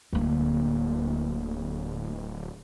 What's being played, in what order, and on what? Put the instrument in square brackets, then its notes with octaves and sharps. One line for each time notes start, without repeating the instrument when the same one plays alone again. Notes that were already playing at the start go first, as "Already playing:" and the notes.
[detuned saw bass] D1 [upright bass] D2 A#3